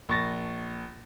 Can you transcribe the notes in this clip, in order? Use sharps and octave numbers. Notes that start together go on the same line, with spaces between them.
A#1 C#6 A6 A#6